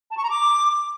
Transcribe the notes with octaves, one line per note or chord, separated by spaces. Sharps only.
A5
C#6
A#5
D6